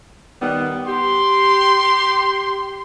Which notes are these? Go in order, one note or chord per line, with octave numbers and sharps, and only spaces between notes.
D#3 G3 B3
G4 C6